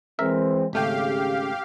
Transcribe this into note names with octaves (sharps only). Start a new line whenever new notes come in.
E3 G#3 C4 A#4 E5
G#1 C#3 A3 G4 F5 G5